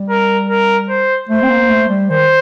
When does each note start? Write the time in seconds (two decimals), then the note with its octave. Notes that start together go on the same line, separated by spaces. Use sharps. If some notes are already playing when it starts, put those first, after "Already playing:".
Already playing: G3
0.10 A#4
0.50 A#4
0.89 C5
1.29 A3 C5
1.42 C4
1.50 A#3
1.69 A3
1.89 G3
2.10 D#3 C5